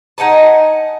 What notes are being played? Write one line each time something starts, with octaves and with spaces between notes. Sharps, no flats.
D#4 F#5 G#5 A5